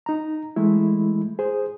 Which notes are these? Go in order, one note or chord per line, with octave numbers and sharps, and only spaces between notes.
D#4 A#5
E3 G#3 A3 E4
G#4 C5